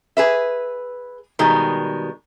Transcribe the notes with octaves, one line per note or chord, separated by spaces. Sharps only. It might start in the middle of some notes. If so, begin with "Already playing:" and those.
G#4 B4 E5
B2 D#3 G3 G#3